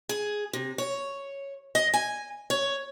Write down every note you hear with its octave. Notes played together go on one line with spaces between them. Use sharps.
G#4
C3
C#5
D#5
G#5
C#5